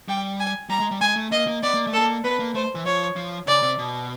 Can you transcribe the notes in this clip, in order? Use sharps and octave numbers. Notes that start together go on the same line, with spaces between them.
G3 G5
G#5
G3 A#5
G#3
G3
G#3 G#5
A3
A#3 D#5
A#3
B3 D5
A#3
A3
A4
A#3
B3 B4
A#3
A3 C5
E3
F3 C#5
F3
C#3 D5
C3
B2